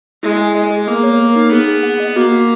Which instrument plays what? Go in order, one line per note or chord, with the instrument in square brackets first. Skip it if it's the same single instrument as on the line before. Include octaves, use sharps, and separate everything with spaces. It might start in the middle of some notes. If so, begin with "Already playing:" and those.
[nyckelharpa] G#3 [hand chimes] E4
[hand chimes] G#5
[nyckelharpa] G#3 [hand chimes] D#5
[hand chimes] G#4
[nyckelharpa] A#3 [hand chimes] B3
[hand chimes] C#5
A#4
D#4
[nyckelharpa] B3 [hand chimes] G#4
[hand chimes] G#4
F#5
D#5
[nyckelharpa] A#3 [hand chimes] F#4
[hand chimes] F#4